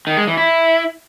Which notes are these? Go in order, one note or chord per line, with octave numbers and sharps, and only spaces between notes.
D#3
G#3
E3
E4